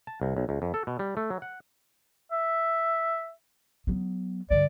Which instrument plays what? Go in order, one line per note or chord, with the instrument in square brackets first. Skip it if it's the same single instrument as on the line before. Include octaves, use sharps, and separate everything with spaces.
[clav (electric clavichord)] A5
C2
B1
C#2
F2
A4
B2
G3
A3
F#3
F#5
[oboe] E5
[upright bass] F#3 B3
[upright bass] G2 D3 [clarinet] D5